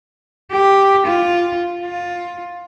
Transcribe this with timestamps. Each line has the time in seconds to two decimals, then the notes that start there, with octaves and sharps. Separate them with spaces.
0.52 G4
1.07 F4
1.83 F4